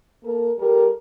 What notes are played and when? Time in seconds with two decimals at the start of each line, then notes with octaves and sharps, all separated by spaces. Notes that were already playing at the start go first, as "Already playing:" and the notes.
0.24 A#3 A4 A#4
0.59 G3 A4 A#4